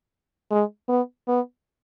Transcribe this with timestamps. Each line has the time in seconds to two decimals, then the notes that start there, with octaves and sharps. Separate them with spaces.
0.51 G#3
0.89 B3
1.28 B3